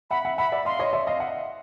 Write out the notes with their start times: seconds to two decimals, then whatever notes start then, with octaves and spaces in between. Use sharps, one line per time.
0.11 E5 F#5 B5
0.25 E5 F#5
0.38 E5 F#5 B5
0.52 D5 E5
0.65 D#5 F5 C6
0.79 C#5 D#5
0.93 D5 E5
1.07 D#5 F5
1.20 E5 F#5